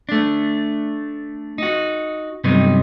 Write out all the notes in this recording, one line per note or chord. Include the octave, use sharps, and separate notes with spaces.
A3 D4
D#4 F#4
G2 C3 F#3 B3 D#4